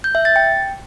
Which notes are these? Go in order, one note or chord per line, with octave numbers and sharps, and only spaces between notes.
G6
E5
A6
G5